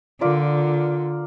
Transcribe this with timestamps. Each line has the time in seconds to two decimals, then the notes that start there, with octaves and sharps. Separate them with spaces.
0.21 D3 F4 A#4 D5